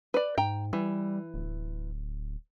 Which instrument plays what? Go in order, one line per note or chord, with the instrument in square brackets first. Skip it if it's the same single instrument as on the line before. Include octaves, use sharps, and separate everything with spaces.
[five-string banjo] B4 D5
[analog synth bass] G#2 [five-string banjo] G5 A#5
[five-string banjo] E3 [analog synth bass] G3
[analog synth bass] D1